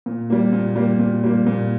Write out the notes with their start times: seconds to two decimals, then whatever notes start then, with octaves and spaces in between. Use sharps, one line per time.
0.06 A#2
0.30 G3 A#3
0.53 A#2
0.76 G3 A#3
0.99 A#2
1.24 G3 A#3
1.47 A#2